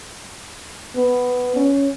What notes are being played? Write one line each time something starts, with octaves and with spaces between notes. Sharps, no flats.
B3
C#4